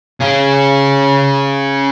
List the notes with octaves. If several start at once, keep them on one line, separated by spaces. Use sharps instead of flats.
C#4 G#4